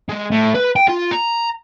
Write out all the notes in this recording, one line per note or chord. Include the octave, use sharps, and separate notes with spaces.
G#3
A2
B4
G5
F4
A#5